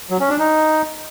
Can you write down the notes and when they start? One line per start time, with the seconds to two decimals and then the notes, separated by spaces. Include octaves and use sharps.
0.10 F#3
0.20 C#4
0.30 D4
0.39 D#4